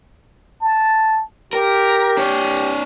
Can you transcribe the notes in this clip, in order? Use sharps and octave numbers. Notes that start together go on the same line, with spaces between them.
A5
G4 A#4
D4 C#5